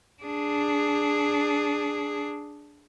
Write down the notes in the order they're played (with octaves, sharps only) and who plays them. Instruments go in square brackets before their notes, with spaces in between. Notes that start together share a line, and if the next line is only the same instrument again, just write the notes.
[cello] D4 G#4